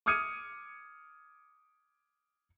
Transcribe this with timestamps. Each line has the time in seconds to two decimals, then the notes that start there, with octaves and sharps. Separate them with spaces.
0.06 D6 D#6 F6 G#6 C#7 D#7